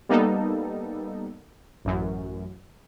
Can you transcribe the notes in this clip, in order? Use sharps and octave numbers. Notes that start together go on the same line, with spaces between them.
G3 A#3 B3 D#4 A4
A1 F#2